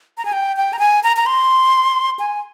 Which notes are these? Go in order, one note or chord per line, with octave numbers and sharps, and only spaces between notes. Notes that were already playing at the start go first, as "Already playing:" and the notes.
A#5
G#5
G5
G5
A#5
G#5
A#5
A#5
C6
G#5